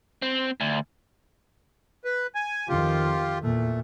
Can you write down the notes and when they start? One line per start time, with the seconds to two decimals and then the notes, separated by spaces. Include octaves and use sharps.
0.22 C4
0.60 D2
2.05 B4
2.35 G#5
2.69 F2 D#3 F4 G4
3.42 E2 A#2 A3